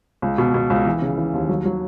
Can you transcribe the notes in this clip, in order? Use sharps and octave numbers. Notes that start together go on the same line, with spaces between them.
C#2
B2
B2
C#2
E3
C#3
E3
D#2
F#3
F#3